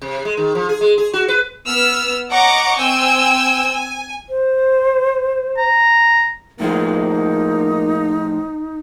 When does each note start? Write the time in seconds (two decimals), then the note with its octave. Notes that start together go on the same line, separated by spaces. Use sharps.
0.02 C3
0.25 G#3
0.37 D#3
0.55 F3
0.69 G#4
0.81 G#3
0.98 G#4
1.14 F#4
1.28 B4
1.67 B3 E6 F6
2.32 C#5 D#5 F#5 A#5 C#6 D6
2.79 C4 G5 G#5 E6
3.69 G#5
4.29 C5
5.58 A#5
6.60 A2 F3 G#3 A#3 D#4